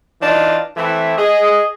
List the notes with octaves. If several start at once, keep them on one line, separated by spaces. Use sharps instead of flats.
E3 D4 D#4 F4
E3 A3 C4 E4
G#4 D#5